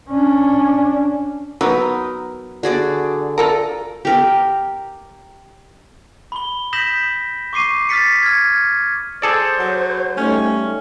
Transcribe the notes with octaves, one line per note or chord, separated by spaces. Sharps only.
C#4 D4
F#3 B3 D#4 A#4 B4
D3 F#4 G#4 D5
F4 A4 A#4
G4 A#4
B5 G7
D#6 G6 A#6 B6 E7 F#7
C#6 D6 C7 D#7
D#6 F6 A6 B6 C#7
F6 G#6
G#4 A4 C5 D5
F#3
G3 A3 C#4 D#4